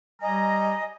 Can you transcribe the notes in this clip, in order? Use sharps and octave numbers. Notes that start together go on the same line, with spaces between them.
G3 D#5 G#5 A#5